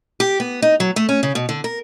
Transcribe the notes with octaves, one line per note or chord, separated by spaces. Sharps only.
G4
B3
D#4
F#3
A3
C#4
C#3
B2
D3
A#4